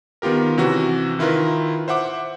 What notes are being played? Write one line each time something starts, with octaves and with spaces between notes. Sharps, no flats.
D#3 B3 F4 G4 A#4
C3 E3 C#4 F#4
D#3 E4 F4 A#4 B4
C5 E5 F#5 D6